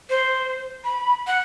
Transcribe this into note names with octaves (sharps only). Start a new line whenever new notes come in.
C5
B5
F#5